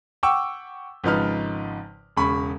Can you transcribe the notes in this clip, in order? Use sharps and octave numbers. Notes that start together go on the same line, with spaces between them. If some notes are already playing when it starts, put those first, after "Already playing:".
F#5 G5 C#6 D6 E6
G#1 C#3 F3 D#4 B4 F6
E1 C#3 B5 C#6